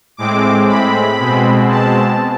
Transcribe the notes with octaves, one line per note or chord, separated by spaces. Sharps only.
A2 G#3 C4 D6
B5
B2 G#3 C4
A5